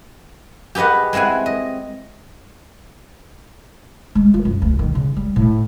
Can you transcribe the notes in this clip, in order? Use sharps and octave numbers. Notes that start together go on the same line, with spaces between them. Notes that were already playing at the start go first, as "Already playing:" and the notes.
G4 G#4 B4 D#5 F#5
G#3 C4 E4 F#5 G#5
D#5
G#3
F4
F#2
D2
D#3
C#3
G3
A2